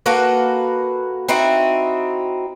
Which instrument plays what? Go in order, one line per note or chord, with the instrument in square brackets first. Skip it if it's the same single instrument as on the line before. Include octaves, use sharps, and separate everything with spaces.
[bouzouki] A#3 F#4 A4 B4
C4 D#4 E4 F#4